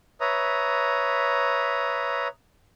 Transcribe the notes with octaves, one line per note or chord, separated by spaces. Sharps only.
B4 C#5 E5 A#5 D#6